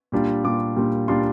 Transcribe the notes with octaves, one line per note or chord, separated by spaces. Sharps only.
A#2 G3 D4 F4
A#2 G3 D4 F4 D6
A#2 G3 D4 F4
A#2 G3 D4 F4 C6